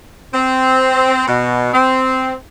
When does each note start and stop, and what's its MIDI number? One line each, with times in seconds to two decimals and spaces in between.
0.34 1.25 60
1.27 1.72 47
1.74 2.33 60